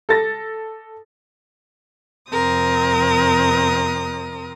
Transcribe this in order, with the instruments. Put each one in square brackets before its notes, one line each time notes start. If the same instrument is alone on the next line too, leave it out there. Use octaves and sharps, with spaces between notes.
[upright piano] A4 A6 A#6
[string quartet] F2 C3 C4 A#4 D#6